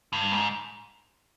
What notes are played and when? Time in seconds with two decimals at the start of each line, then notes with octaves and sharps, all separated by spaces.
0.13 G2
0.32 G#2